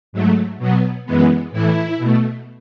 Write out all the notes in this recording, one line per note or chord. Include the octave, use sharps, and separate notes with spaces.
G#2 F#3 A3
B2 F#3 B3
F#2 E3 G#3 B3
A2 E3 A3 E4
B2 A3